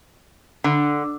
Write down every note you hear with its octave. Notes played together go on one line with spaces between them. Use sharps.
D3